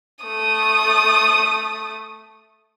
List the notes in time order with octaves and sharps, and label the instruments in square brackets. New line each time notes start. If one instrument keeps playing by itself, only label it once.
[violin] A3 D#6